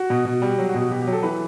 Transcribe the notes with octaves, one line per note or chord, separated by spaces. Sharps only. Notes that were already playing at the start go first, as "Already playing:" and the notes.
Already playing: F#4
B2
B2
G3
F#3
F#4
B2
F#4
B2 G4
G4
F#3
A4
E3 B4